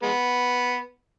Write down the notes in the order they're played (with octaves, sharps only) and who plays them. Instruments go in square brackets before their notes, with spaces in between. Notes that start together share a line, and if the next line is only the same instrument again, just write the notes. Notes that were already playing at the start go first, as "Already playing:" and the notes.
[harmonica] G#3 B3